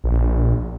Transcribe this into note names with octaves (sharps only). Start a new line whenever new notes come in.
A#1